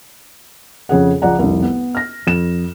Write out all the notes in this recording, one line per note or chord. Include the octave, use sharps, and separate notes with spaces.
F2 C#3 G#4 F#5
C#2 F3 D5 F#5 A#5
F1 C2
B3
F6 A#6
F2 E7